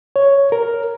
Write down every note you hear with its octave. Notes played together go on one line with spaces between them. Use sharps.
C#5
A#4